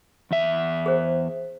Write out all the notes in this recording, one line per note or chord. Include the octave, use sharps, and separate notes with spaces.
E2 E5
G#4 C5